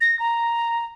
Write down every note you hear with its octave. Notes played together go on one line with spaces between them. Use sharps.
A#6
A#5